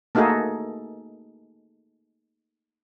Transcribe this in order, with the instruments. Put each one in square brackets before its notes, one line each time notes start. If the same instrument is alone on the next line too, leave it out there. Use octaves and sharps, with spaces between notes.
[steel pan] A3 A#3 D#4 F#4 G#4 A4